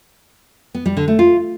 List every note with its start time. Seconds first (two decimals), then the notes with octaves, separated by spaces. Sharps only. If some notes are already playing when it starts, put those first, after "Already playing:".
0.74 B3
0.86 G3
0.97 D3
1.08 A3
1.19 F4